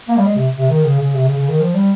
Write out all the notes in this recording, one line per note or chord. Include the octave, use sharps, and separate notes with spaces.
A#3
G3
G#3
C3
C3
D#3
C#3
C#3
C3
C#3
C#3
D#3
F3
G3